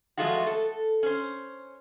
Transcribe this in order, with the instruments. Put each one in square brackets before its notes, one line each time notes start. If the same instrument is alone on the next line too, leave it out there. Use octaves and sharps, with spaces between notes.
[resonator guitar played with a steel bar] F3 G#3 A3 F4 F#4
A4
C#4 C5